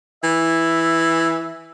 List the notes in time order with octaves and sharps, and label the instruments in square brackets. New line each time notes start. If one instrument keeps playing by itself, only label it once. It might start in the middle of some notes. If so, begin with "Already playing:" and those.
[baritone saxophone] E3 [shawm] E5